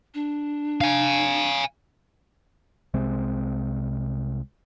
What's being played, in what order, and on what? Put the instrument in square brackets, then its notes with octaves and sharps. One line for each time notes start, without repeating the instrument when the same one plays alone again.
[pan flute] D4
[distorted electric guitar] F5 G#5
[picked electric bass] C2 C3 G#3 C4